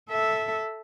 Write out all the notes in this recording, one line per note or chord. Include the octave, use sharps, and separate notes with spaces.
A4 E5